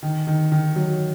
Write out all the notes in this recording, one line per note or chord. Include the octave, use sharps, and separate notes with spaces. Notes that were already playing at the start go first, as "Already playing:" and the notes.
D#3
D#3
D#3
F#3